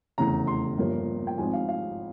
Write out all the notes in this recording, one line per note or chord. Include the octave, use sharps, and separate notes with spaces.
F1 E2 C#3 A#5
C6
G1 G2 F3 A#3
G5
G#1 G#2 F3 G#5
F5
F5